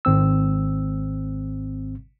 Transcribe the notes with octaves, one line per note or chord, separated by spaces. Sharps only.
G#1 C4 E6